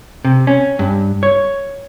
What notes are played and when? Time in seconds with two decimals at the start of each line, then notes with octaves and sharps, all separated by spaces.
0.25 C3
0.47 C#4
0.79 G2
1.23 C#5